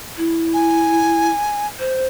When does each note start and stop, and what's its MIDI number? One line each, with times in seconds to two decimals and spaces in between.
0.17 1.30 64
0.54 1.67 80
1.79 2.07 72